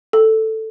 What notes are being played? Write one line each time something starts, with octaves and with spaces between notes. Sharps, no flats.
A4